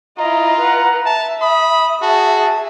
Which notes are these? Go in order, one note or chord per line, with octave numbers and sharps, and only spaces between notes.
E4 F4 D#5 A#5
B4 F#5
E5 A5
B5 D#6
F#4 G#4 E5 A5